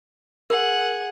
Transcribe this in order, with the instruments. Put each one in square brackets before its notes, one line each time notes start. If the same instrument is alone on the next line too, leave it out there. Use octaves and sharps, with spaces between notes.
[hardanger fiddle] G#4 F#5 [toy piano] A#4